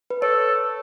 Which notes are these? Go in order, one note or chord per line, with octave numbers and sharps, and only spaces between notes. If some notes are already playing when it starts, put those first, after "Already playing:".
B4
A4 C#5